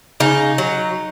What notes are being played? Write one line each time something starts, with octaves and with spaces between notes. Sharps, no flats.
C#3 D#4
F#3